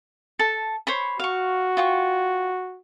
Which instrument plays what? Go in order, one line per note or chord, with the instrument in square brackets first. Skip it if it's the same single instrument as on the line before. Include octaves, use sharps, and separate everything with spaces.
[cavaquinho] A4 A5
C5 C#5 B5
[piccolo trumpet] F#4 [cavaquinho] F5 C#6
[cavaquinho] F4 G5 C#6